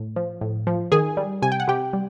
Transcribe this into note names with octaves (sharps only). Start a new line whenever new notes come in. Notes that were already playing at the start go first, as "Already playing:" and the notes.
Already playing: A2
F3
A2
F3
D#3 G#4 G#5
G3
C3 G#5
G5
F#5
C3 G4 G5
G3